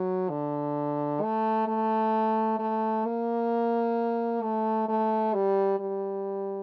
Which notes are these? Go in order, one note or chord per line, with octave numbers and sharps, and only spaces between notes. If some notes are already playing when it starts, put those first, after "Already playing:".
Already playing: F#3
D3
A3
A3
A3
A#3
A3
A3
G3
G3